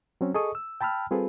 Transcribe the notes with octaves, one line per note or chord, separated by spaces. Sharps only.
F#3 C4 C#4
G#4 A4 D#5 C#6 D#6
E6
G5 A5 B5 E6 F6
G3 C4 F4 G#4 A4 B4